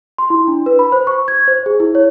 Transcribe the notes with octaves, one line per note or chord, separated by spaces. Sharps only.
C6
E4
D4
B4
B5
C5
C#6
G#6
C5
G#4
E4
C#5